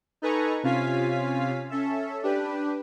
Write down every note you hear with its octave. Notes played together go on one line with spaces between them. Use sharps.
D#4 A4 B4 G#5 A#5 C#6
C3 C#4 F4 F5 G#5 B6
C#4 A4 E5
D4 G4 B4